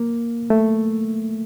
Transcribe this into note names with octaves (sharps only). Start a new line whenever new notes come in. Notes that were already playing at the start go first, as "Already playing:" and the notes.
Already playing: A#3
A3